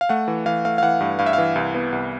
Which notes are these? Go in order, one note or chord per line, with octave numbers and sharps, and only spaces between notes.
F5
A3 F#5
E3
E3 F5
A3 F5
F5
E3 F#5
G2
G2 F5
E5
E3 F5
C2
B3
C2